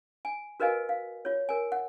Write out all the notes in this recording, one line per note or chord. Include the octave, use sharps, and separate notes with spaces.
G#5
F#4 A#4 B4 D#5 F5 G#5
F5
F4 C#5
A#4 G#5
F#5